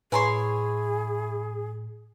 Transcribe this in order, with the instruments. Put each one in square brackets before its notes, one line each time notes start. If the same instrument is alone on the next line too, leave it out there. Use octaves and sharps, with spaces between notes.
[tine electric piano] A2 [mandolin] E4 C#5 C6 [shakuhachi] G#4 [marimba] B4 G#5 A#5